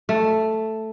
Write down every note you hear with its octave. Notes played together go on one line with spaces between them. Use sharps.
A3